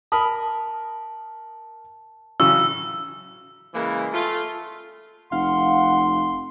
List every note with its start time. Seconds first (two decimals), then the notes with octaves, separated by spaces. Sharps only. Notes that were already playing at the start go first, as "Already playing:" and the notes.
0.12 A#4 A5 B5 D#6
2.40 A1 C#3 F#3 E6
3.75 C#3 E3 G#3 A#3
4.13 A3 F4
5.32 F1 F5 F#5 C6